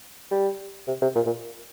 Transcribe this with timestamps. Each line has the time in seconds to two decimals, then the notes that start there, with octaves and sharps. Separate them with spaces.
0.31 G3
0.87 C3
1.02 C3
1.15 A#2
1.26 A#2